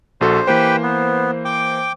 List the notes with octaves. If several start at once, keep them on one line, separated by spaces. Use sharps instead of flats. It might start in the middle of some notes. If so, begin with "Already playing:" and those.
A#1 F#4 A4 C5
E3 A#3 G4 B4 C5 G5
B3
G5 D6